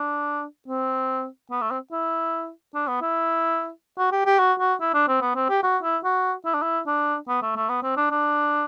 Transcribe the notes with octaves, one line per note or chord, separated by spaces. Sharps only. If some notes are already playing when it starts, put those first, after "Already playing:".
Already playing: D4
C4
B3
A3
C4
E4
D4
B3
E4
F#4
G4
G4
F#4
F#4
E4
D4
C4
B3
C4
G4
F#4
E4
F#4
E4
D4
E4
D4
B3
A3
A3
B3
C4
D4
D4